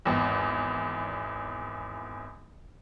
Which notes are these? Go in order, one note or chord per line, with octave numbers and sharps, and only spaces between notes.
G#1 E2